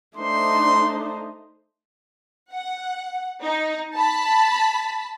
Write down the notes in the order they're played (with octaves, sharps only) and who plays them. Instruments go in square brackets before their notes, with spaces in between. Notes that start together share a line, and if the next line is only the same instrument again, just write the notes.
[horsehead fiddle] A3 D#4 [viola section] D4 C5 [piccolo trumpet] C6
[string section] F#5
D#4
A5 B5